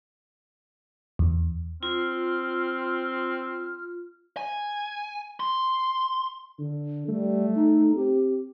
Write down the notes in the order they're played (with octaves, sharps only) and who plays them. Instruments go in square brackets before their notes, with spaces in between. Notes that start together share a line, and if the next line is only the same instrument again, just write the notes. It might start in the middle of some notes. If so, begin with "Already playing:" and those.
[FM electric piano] E2
[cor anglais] C4 [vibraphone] F4 [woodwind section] C6 F6
[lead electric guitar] G#5
C6
[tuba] D3
[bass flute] G3 [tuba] A3
[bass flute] D#4
[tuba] C4 [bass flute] G4